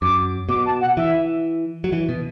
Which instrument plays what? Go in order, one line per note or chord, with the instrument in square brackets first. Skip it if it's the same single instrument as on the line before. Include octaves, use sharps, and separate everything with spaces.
[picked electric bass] F#2 [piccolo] D6
[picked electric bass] B2 [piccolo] D6
[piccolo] A5
F#5
[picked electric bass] E3 [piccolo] E5
[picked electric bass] F#3
E3
B2